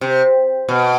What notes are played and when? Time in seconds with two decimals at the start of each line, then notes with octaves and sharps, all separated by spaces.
0.01 C3
0.69 B2